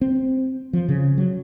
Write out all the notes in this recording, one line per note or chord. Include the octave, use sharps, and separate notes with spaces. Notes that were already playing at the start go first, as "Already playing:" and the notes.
C4
F3
C#3
F#3